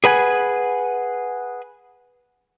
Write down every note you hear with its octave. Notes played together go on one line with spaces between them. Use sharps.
G#4 B4 F#5 G#5